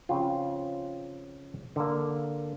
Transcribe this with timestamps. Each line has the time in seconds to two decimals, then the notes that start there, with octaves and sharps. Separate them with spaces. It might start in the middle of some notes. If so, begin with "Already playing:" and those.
0.09 C#3 F3 C4 F4
1.76 D3 A#3